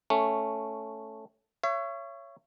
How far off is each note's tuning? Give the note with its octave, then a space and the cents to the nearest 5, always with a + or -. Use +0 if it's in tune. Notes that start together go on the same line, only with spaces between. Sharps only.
A3 +0 C#4 +0
C#5 +0 E5 +40